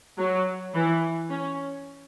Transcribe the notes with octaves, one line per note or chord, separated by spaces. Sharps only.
F#3
E3
C#4